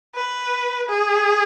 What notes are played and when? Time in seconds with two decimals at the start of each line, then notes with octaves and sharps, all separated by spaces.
0.15 B4
0.89 G#4